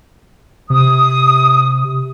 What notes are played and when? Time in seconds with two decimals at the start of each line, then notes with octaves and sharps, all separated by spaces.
0.70 C3 D#6